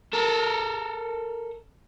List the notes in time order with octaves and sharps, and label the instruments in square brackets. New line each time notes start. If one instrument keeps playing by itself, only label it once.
[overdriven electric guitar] A4 A#4